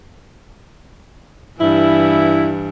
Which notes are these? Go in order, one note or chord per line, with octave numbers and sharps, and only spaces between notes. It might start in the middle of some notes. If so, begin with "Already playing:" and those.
G2 E3 E4